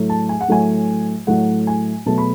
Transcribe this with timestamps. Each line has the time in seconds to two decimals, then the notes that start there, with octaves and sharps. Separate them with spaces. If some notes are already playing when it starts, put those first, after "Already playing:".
Already playing: A2 F#3 A3
0.09 A5
0.29 G#5
0.41 F#5
0.48 A2 F#3 A3 G#5
1.27 A2 F#3 A3 F#5
1.67 G#5
2.06 B2 F#3 A3 A5
2.18 B5